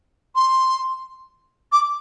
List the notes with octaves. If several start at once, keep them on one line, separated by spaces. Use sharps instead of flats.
C6
D6